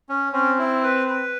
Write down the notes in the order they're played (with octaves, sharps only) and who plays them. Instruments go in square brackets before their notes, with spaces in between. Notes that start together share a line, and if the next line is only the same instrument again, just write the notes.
[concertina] C#4
[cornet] C4 [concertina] C#4
[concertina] E4
B4
B4